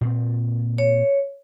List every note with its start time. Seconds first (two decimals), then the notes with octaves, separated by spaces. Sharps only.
0.01 A#2 C4
0.78 C#5